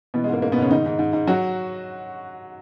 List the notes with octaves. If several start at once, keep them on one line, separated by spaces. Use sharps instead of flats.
B2 E3 B3
G#3
G#2 A#3
G#2 A#3
B2 B3
G#2 C#3 C#4
G#2 D#3 D#4
G#2
G#2
G#2
F#3 F#4